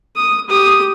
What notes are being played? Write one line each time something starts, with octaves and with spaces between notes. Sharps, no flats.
D#6
G4 D#6